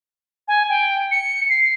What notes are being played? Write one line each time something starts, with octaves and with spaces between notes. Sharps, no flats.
G#5
G5
C#7
C7